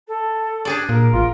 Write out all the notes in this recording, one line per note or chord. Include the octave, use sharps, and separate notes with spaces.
A4
D4 G4 G#4 D5
A#2 A#4
A1 F4